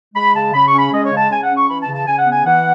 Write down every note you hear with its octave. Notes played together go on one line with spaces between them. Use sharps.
G#3 B5
C#3 A5
C#3 B5
C#6
C#4
B5
G#3 D#5
C#5
C#3
A5
C#3 G#5
F#5
C#4
C#6
E3 B5
A5
C#3
A5
C#3 G#5
F#5
B3 G#5
E3 F#5